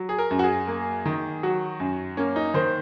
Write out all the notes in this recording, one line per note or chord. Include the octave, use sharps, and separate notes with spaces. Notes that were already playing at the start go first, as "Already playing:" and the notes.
Already playing: F#3
G#4
A#4
F#2
F#4
G#4
A#3
D#3
F#3 F#4
F#2
A#3 C#4
D#4
D#3 C5